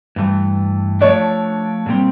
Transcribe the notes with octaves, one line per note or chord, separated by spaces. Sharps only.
G2 E3 A3
F3 A3 D4 C#5
A#2 G3 C4